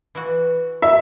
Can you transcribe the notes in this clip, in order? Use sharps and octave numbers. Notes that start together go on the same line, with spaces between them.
E3 E4 F#4
C#4 E5